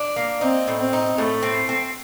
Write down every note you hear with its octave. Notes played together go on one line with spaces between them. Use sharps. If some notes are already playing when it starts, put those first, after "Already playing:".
Already playing: D4
A#3
C4 D#4
A2
C4
D#4
A2 A3
C4
C4